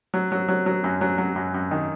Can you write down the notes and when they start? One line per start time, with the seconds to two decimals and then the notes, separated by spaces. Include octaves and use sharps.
0.14 F#3
0.32 F#3
0.48 F#3
0.66 F#3
0.84 F#2
1.01 F#3
1.18 F#3
1.36 F#2
1.54 F#2
1.71 D#3